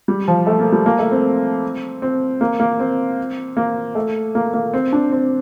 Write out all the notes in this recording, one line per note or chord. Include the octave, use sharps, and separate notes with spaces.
G3
F3
A3
A#3
G3
A#3
A3
C4
C4
A#3
A#3
C4
A#3
A3
A#3
A#3
C4
D4
C4